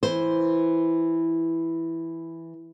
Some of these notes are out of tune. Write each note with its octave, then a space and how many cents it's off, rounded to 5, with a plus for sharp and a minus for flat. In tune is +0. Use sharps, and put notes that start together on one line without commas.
E3 +0 C5 +0